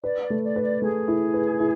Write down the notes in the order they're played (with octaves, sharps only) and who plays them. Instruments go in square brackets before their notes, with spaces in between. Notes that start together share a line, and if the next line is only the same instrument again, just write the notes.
[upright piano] B4 [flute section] D5
[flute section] D5
[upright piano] A3
[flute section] D5
[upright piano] B4
[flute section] D5
[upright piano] A3 [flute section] G#4
[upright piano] E4
B4
E4